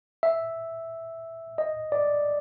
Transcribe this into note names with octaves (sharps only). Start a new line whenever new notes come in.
E5
D#5
D5